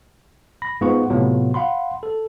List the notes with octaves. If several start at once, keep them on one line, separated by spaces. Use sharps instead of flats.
B5 A#6
G#2 B3 F4 G#4 F#5 C#6
A2 C3 F#3 B3 F4
F5 F#5 B5 C6
A4